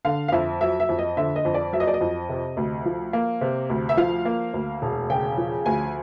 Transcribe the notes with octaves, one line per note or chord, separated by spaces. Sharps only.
D3 F5
F5
F2 E5
F#3 E5
E5
F2
D#5
D3 E5
D#5
F2
D5
F#3 E5
D#5
D5
D#5
F2
C3
D2
F3
A#3
C3
D2
E5
F3 F5
A#3
D2
E1
C#3 G5
F3
D2 G#5